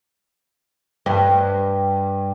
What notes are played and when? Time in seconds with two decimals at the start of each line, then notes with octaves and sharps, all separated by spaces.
1.06 G2